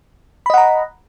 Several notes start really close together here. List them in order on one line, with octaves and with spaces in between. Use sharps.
B5 D#5 F#5 A#5